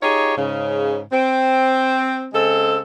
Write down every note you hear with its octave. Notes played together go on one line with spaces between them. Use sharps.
D#4 F4 G4 G#4 C#5
G#2 C#3
C4
C#3 G#3 C4 A4